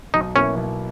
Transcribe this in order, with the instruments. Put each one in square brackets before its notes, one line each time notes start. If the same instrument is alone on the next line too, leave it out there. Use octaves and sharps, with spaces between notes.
[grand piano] B1 [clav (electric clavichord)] D#4
[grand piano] B2 A#3 E4 [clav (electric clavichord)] C#4
[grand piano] B1